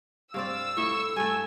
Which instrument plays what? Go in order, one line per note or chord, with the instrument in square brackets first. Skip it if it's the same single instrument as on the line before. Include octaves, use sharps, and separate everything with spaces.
[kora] G2 C4 D5 [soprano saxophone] F5 [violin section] E6
[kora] A2 E4 [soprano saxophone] C#6
[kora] G2 A3 [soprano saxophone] G#5